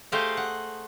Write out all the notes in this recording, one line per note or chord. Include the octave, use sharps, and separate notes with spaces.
A3 G4 G#4 C5 D#5 F5
F#5